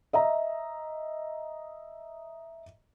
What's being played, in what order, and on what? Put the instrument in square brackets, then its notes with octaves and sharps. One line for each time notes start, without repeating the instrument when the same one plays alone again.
[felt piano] D#5 E5 A#5